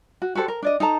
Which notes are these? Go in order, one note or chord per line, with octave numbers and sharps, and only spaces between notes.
F#4
F#4 G4 A4 C5
A#4
D4 D5 D#5
D#4 A4 A5 A#5